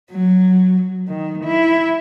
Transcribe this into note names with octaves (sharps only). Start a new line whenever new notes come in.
F#3
D#3
E4